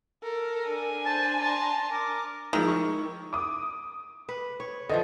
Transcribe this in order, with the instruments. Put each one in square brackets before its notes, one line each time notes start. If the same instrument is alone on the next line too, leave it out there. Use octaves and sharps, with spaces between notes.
[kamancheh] A4 A#4
[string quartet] D4 G#5
[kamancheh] C5 [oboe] A5
[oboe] A5 [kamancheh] A#5 C6
[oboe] A#4 [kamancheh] D6
[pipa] D#3 [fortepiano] F3 G#3 E4
[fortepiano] C#6
[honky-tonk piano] D6 D#6
[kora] B4
C#5
[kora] D3 E3 F3 [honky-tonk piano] D#5